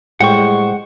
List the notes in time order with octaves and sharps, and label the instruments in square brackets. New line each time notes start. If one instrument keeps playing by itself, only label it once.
[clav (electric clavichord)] A2 G3 [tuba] G#3 [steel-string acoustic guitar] C5 G5 [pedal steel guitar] F#5 C#6